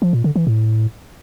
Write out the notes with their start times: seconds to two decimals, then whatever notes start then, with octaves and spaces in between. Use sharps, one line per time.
0.02 F3
0.13 A#2
0.24 D3
0.36 E3
0.47 A2